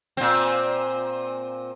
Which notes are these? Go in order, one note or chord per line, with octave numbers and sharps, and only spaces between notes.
A#2 C4